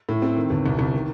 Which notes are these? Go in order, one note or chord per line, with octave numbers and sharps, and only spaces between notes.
A2
C4
D#3
G1
C2
C2
D#3